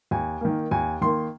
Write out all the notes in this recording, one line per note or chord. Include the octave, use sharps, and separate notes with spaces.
D#2 G#5
D#3 A#3
D#2 G#5
D#3 A#3 C6